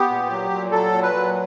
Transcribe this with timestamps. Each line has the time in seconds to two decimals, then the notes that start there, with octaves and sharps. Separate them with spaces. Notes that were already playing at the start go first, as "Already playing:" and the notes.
Already playing: B3 G4
0.10 A#2
0.30 F#3
0.51 A#2
0.72 F#3 A4
0.93 A#2
1.02 B4
1.13 F#3